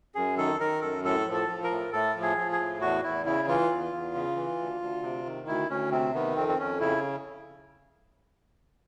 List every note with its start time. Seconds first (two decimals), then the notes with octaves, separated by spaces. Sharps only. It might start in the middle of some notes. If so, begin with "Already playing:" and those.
0.15 F#2 G#4
0.38 D#3 A4
0.60 D#3 A#4
0.81 F#2 A4
1.04 A2 A4
1.27 F3
1.33 A4
1.48 F3
1.64 A#4
1.71 A2
1.93 A2 A4
2.16 F3
2.22 G#4
2.37 F3
2.52 G#4
2.60 A2
2.81 E2 F#4
3.04 E2 E4
3.25 C#3 E4
3.48 E3 F4
3.70 E2
3.93 E2
4.15 C#3
4.36 E3
4.59 D2
4.81 D2
5.03 C3
5.26 D#3
5.48 D2 E4
5.70 D2 C#4
5.91 C3 C4
6.14 D#3 B3
6.36 F2 C4
6.48 C4
6.59 F2 C#4
6.80 C#3 E4